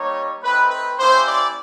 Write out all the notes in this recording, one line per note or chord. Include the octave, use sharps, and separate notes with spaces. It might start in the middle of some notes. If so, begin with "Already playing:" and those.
Already playing: G3 A#3 D#4 C#5
A3 C4 D#4 B4
B4
A#3 C#4 E4 G4 C5
D5